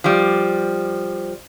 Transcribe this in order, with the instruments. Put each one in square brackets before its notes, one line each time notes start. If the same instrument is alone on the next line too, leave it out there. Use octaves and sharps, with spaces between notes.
[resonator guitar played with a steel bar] F3 G3